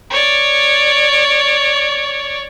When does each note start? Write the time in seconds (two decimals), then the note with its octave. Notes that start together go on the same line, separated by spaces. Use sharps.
0.10 C#5 D5